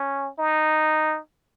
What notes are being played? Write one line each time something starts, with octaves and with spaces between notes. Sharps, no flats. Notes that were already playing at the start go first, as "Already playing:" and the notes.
Already playing: C#4
D#4